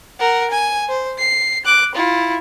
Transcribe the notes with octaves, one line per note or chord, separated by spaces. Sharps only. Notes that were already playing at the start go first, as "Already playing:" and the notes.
A#4 F#5
G#5
C5
C7
D6 F#6
E4 F4